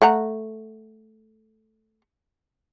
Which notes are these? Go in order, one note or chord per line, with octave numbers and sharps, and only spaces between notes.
A3 F#5 A#5